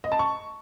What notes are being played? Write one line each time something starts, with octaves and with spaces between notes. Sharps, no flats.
D#5
A5
C#6